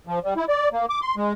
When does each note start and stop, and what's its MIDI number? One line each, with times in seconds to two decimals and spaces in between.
0.07 0.19 53
0.24 0.34 55
0.37 0.45 64
0.49 0.69 74
0.73 0.86 58
0.89 1.00 86
1.02 1.15 84
1.17 1.33 56